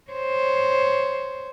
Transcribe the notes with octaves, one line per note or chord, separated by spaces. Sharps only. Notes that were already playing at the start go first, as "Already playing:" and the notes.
C5 C#5